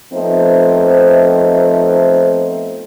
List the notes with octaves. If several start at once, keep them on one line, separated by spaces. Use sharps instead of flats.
F3 A3 B3 C4 D#4 C5